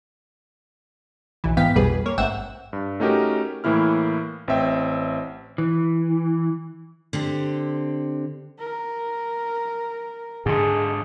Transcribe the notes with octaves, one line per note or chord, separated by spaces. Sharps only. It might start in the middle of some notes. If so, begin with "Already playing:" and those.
B1 E3
G#2 E3 B3 F5 G5 B6
B1 F2 B2 G3 G#4 B4
A#3 C#5
A1 G#2 E5 F#5 G5 E7
G2
A3 C#4 D#4 F#4 G4 A#4
A2 E3 A#3 E4 F6
A1 C4 E5 G5
E3
D3 C4 G4
A#4
G#2 D3 G#4